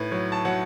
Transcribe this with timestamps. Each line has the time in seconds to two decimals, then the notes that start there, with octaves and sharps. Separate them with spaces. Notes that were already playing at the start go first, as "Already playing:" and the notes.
Already playing: A2 B4
0.12 F#3
0.32 A5
0.45 F#3 F#5